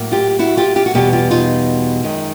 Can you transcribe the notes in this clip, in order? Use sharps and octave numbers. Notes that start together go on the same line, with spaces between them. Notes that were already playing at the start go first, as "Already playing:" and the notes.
Already playing: A2 F#3 A#3
F4 G4
E4 F#4
F4 G4
F4 G4
F#4
E2 B2 G3 B3 F4 G4
F4 G4
D#4 F4
F#2 D#3 G#3